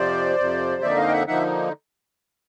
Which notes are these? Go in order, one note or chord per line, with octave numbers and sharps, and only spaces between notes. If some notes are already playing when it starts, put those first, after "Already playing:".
Already playing: F2 C3 F3 C5 D5
F2 C3 F3
F2 D3 F3 A#3 D#4 D5 E5
D#5 F5
G5
E5 F#5
D3 F3 A#3 D#4 E5 F#5